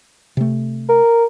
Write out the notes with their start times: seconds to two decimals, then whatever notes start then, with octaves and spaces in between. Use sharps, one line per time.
0.37 C3 A3
0.89 A#4